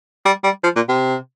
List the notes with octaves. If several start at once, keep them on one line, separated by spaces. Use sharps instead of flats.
G3
G3
F3
A#2
C3